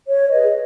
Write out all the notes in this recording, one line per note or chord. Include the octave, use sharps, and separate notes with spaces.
C#5
G#4 B4 D#5